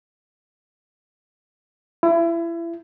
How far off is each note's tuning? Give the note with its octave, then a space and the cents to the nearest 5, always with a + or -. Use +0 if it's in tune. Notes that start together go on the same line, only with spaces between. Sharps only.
E4 +30